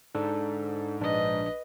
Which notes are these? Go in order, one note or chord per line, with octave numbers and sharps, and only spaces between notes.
G#2 D4 A4
A#1 D4 B4 D#5